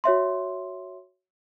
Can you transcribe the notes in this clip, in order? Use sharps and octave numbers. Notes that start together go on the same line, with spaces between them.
F#4 C#5 E5 C6